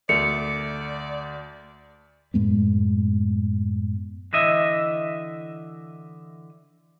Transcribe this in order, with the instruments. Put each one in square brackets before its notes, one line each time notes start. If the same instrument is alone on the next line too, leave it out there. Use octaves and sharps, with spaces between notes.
[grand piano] D2 A3 F7 [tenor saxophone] D5 [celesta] C#7
[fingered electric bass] F#2 A2 G#3 B3
[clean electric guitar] D3 E3 D#5 E5